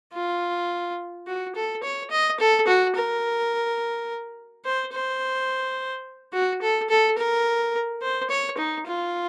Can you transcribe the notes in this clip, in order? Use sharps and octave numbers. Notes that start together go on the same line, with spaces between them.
F4
F#4
A4
C#5
D#5
A4
F#4
A#4
C5
C5
F#4
A4
A4
A#4
C5
C#5
D#4
F4